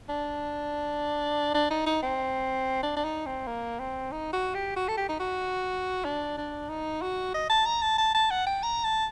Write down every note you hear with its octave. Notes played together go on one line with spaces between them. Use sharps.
D4
D4
D#4
D#4
C4
D4
D4
D#4
C4
A#3
C4
D#4
F#4
G4
F#4
A4
G4
D#4
F#4
D4
D4
D#4
F#4
D#5
A5
A#5
A5
A5
A5
F#5
G5
A#5
A5